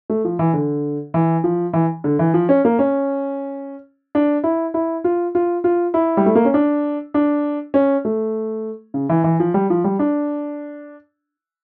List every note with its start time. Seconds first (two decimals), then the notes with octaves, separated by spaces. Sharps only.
0.10 A3
0.25 F3
0.39 E3
0.54 D3
1.14 E3
1.44 F3
1.73 E3
2.04 D3
2.19 E3
2.34 F3
2.49 C#4
2.65 A#3
2.79 C#4
4.15 D4
4.44 E4
4.74 E4
5.04 F4
5.35 F4
5.64 F4
5.94 E4
6.17 G3
6.26 A3
6.35 A#3
6.45 C#4
6.54 D4
7.14 D4
7.74 C#4
8.05 A3
8.94 C#3
9.09 E3
9.24 E3
9.40 F3
9.54 G3
9.70 F3
9.84 G3
9.99 D4